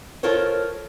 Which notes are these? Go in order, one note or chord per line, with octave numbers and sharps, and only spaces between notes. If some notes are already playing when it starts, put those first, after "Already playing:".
F4 A4 A#4 C5 C#5